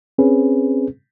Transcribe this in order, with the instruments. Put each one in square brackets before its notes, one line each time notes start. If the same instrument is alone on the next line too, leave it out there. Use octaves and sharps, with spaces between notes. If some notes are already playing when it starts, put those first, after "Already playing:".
[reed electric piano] C4 C#4 G#4 B4